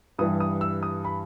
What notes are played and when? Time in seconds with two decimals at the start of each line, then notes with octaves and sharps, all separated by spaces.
0.19 G2 E3 G3 D#6
0.40 D#6
0.61 E6
0.83 D#6
1.05 B5